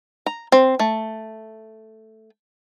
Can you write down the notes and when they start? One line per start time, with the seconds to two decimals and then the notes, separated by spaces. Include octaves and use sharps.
0.26 A#5
0.52 C4
0.80 A3